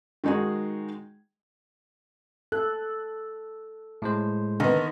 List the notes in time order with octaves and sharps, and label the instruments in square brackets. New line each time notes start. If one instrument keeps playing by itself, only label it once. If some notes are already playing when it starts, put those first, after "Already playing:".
[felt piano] D#3 G#3 D#4 F#4 G#4
[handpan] A4 [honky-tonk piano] F#6
[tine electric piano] A2 G#3 C5
[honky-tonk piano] D3 B3 [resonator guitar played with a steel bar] D#3